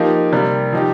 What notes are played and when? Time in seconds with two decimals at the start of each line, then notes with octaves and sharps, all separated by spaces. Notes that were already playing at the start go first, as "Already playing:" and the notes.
Already playing: F3 A#3 D#4 G4
0.32 C3 G3 A#3
0.73 F3 D#4 G4